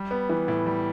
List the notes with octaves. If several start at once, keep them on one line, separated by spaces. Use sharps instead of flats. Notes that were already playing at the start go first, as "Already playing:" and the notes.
Already playing: G3
B3
E3
A2
G3